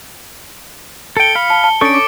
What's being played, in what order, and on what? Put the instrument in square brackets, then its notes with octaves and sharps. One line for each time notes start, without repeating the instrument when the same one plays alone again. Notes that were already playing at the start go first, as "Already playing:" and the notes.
[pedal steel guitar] A4 G5 [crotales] C#7 G7
[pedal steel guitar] F5 B5
[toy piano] A5
A5
[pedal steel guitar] C#4 D4 C#6 [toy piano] A4 C#5 [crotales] A6 D7
[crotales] D6